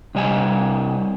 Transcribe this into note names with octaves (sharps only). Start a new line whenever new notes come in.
C3 G3 D#5 G#5